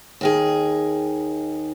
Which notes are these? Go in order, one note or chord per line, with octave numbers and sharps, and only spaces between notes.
D#2 D#3 G#4